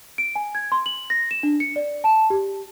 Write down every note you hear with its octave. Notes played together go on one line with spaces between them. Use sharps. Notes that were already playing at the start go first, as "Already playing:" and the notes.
D7
G#5
G#6
C6
F#7
A#6
E7
D4
C#7
D5
A5
G4